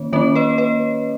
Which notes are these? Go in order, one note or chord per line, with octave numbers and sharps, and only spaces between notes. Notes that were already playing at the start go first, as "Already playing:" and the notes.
Already playing: D#3 A#3 C#4 C#5
D#3 A#3 C#4 C#5
B4 D#5
B4 D#5